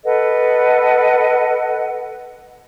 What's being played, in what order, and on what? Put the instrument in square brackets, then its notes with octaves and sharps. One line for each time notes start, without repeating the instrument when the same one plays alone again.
[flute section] A4 B4 D#5 F#5